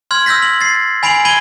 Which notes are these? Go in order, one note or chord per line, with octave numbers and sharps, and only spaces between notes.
C6 F6 G#6
E6 F6 G6 A#6 B6
F#7
A6 C7
G#5 B5 C7 D7 F7 F#7
B5 G#6 D#7 F#7 G7